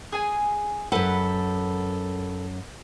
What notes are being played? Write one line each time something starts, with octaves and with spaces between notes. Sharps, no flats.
G#4 G#5
F#2 A4 B4 F#5